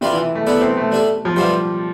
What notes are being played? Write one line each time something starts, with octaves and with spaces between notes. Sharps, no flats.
C3 G3 D4 F4 B4 D5
E3
A3
A3 B3 E4 A4 D5
C4
A3
G3 D4 A4 E5
F3
G3 B3 D4 F4 C5 E5